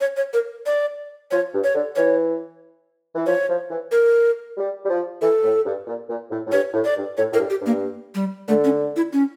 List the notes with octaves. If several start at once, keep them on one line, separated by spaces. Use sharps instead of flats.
C#5
C#5
A#4
D5
F3 C#5
G2
C#5
D3
E3 C#5
E3
F3 C#5
F3
E3
A#4
G3
G3
F3
E3 A4
A2
G2
A#2
A#2
A2
A2
G2 C#5
A2
D5
G2
A2 C#5
A2 A#4
G2
G4
G2
A#3
G3
D3 A3
C#4
E4
C#4